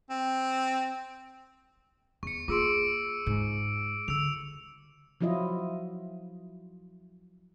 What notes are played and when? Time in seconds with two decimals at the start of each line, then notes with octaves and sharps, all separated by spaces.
0.10 C4
2.23 E2 C#6 C#7
2.48 A#3 F4 G#4 C6 D6 E6 D7
3.26 G#2
4.08 D3 E6 F7
5.21 F3 F#3 E4 F4 D#5